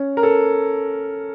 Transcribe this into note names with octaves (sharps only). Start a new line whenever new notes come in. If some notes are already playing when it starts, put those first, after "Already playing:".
Already playing: C#4
A#4
A4